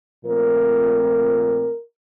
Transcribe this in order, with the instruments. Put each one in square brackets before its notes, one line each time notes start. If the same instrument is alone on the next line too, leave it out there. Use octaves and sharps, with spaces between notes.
[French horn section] A#2 F3 A3 C4 A#4